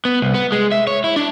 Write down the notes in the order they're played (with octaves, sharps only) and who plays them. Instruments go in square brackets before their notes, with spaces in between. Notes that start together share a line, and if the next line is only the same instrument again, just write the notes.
[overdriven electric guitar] B3
C2
B3
G#3
E5
C#5
E4
D4